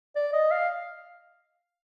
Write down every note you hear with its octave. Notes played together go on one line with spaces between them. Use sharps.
D5
D#5
F5